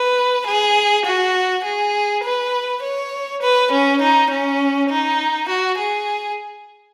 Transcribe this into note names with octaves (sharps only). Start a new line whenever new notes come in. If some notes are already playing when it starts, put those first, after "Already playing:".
Already playing: B4
G#4
F#4
G#4
B4
C#5
B4
C#4
D#4
C#4
D#4
F#4
G#4